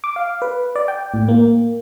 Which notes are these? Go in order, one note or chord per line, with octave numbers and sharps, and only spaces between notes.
D6
F5
B4
D5
G5
A2
A#3